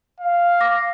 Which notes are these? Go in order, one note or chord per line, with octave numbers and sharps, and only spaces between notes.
F5
D6 A#6